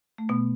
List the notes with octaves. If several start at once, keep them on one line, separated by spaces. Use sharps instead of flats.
A3
B2 B3